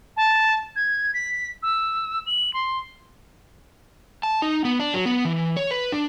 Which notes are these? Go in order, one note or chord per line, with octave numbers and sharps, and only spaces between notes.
A5
G#6
B6
E6
F#7
C6
A5
D#4
B3
D4
F#3
B3
E3
C#5
B4
D4